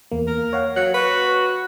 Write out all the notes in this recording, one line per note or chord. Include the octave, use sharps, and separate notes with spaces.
E2 A#3
A#4
C#5 F5 F#5
F#3 F#6
F#4 B4